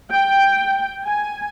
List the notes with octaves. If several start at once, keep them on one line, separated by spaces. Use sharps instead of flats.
G5
G#5